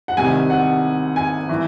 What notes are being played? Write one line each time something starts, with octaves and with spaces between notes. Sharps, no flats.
F#5
C2 C3 D#3 G#5
F#5
G#5
E3